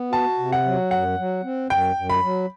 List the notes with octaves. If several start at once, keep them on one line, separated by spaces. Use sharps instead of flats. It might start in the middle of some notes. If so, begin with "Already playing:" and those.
Already playing: B3
F#4 A5
C3
F#5
F#3
F#2 F#5
F#3
C4
F#2 G5
F#2
B5
F#3